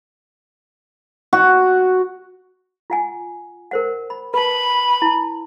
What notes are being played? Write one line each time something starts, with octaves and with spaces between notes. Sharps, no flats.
F#4
F4 F#5 G#5
A#4 C5 F#5
B5
B4 A5 B5
E4 A5